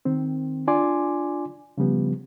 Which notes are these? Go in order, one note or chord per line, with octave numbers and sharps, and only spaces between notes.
D#3 C4
D4 F4 D5 G#5 C6 D6
C#3 F3 G3 B3